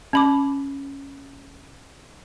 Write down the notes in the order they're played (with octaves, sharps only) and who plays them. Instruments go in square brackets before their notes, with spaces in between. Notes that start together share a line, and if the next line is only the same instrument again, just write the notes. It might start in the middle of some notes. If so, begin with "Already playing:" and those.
[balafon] C#4 B5 D6